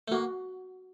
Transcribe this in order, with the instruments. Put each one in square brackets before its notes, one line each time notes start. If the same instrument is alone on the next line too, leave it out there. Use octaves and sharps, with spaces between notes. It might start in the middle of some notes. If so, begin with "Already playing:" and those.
[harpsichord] A3
[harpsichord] A#3 [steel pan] F#4